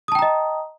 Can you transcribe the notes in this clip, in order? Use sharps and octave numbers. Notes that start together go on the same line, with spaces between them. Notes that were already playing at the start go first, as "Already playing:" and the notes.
D#5 G5 A5 A#5 D#6